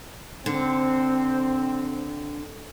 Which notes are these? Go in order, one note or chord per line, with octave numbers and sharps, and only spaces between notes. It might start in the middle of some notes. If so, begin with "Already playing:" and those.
D3 C4